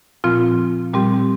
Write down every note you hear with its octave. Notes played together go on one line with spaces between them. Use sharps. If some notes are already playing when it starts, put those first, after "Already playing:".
A#2 F3 C4 F4
A#2 G3 C4 G4